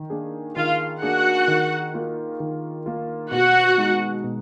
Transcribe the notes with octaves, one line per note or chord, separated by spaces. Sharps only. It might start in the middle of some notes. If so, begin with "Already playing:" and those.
Already playing: D#3
A#3 D4 G#4
D#3 F4 F5
A#3 D4 F#4 G#4 F#5
D#3
A#3 F4
D#3
A#3 F4
B2 F#4 F#5
G#3 D#4
B2